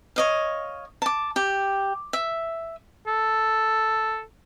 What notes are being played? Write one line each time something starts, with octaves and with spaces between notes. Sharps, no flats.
C#5 D#5 F5
A5 D6
G4
E5
A4